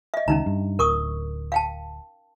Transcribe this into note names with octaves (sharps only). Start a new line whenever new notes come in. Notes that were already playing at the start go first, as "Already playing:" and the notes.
D#5 E5
C#2 D#3 C#4 D#4 A#5
G2
D1 A#4 C#6 D#6
F5 G5 A5